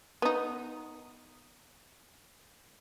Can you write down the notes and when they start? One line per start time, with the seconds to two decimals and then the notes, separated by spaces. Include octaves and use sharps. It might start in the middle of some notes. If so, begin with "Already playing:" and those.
0.22 B3 D#4